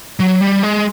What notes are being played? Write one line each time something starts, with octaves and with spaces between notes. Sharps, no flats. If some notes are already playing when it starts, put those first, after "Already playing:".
F#3
G3
G#3